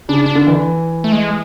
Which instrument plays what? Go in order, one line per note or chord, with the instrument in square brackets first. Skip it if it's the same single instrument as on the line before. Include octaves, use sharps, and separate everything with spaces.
[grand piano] C#3 [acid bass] D4
[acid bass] D4
[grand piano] D3
E3
[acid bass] A3
G#3